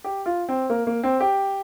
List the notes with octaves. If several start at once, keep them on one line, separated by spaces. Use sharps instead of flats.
G4
F4
C4
A#3
A#3
C4
G4